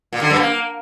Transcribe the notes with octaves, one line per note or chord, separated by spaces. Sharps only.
A#2
D3
F#2
A#3